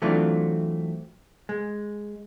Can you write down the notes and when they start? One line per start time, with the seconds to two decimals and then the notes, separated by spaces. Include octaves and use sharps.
0.02 E3 F#3 A3 C4 D4 F4
1.49 G#3